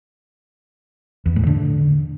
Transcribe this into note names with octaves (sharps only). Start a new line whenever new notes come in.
E2
A2
D3